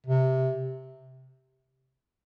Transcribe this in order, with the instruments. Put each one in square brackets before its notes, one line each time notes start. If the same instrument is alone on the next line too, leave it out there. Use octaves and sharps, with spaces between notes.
[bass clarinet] C3